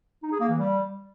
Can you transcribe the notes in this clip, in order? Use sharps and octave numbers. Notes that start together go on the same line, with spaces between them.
D#4
G#4
A#3
E3
G3